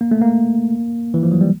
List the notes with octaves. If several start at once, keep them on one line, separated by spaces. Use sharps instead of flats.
A#3
A3
A#3
E3
F3
F#3
G3